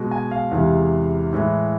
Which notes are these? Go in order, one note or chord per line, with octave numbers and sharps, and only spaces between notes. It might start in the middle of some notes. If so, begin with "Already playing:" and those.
Already playing: B2 G#3
G#5
F5
E2 C3 E3 G#3
A2 E3 G#3